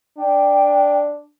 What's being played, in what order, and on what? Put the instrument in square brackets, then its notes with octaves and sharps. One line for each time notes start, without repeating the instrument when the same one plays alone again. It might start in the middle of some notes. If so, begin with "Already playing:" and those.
[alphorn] D4 [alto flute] G5